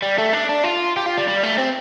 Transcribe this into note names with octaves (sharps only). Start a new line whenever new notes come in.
G3
A3
D4
D4
F4
G4
F4
G3
G3
A3
C4